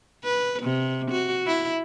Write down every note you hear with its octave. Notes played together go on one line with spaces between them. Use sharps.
B4
C3
F#4
E4